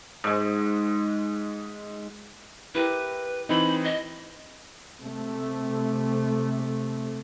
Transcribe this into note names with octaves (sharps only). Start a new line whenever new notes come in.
G#2 G#3
E4 G4 A#4 B4
E3 C4 D#4 B5
D#5
C3 A3